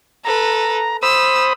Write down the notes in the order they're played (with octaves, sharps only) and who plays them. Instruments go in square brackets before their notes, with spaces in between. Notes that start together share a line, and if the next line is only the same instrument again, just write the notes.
[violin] A4 B4 [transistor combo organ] A#5
[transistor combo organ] C5 B5 D#6 [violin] E6